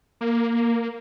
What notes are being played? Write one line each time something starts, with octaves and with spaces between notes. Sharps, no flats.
A#3